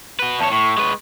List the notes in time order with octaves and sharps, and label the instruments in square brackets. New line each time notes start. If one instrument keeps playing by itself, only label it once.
[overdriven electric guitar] F#4 B4
[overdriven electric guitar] E2 C#5 [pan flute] A5
[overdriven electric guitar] A2 [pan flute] C#6
[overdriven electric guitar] G#3 B4